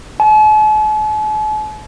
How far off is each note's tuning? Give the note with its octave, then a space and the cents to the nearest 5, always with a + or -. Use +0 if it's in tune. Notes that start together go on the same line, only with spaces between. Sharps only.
A5 -45